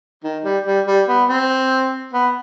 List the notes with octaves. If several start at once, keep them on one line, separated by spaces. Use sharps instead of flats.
D#3
G3
G3
G3
B3
C4
B3